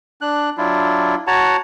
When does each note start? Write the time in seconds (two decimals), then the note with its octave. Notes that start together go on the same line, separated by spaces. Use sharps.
0.21 D4 F#6
0.58 F#3 D4 E4 F4
1.27 F#4 C#5 F#5 A5 A#5